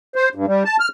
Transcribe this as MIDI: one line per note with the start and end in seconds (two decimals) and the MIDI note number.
0.15 0.29 72
0.35 0.46 43
0.48 0.63 55
0.65 0.76 81
0.80 0.88 89